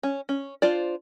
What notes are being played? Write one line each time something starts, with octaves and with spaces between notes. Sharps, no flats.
C#4
C#4
D4 F4 C5 D5